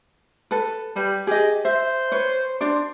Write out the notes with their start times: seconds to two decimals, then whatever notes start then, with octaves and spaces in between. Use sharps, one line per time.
0.51 A4 B4
0.96 G3 B4
1.27 G4 G#4 D#5
1.65 C5 E5
2.12 B4 C#5
2.61 D4 C5 D5